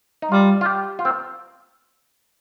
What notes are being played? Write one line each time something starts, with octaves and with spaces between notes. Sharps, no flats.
D#4
G3 F4
F4
G4
F4
C4